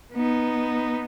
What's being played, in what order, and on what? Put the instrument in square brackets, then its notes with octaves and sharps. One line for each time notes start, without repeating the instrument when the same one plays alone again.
[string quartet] B3 D#4